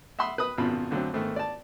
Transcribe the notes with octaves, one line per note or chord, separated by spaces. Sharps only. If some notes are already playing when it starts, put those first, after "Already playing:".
E5 F#5 B5 C6 D#6
B4 B5 D#6
G#1 F#2 B2 F4 B5
F2 D3 F#3 A3 C4
G#2 D#3 A3 B3
D5 A5